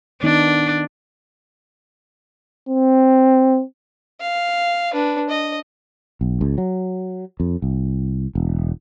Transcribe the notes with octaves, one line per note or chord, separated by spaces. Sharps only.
D#3 B3 D4 D#4
C4
F5
D4 B4
D#5
B1
C#2
F#3
F2
C2
E1